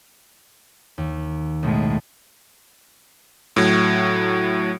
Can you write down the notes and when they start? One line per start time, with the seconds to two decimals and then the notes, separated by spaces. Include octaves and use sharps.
0.98 D#2
1.63 B1 A2 G#3
3.56 A2 F#3